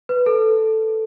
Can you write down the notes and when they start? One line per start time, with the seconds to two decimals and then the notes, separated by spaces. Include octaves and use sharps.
0.09 B4
0.26 A4